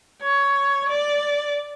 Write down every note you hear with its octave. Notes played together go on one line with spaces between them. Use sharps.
C#5
D5